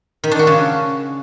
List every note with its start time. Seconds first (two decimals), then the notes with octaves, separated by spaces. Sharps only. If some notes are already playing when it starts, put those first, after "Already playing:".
0.24 D#3
0.31 D4
0.39 F#4
0.47 C#3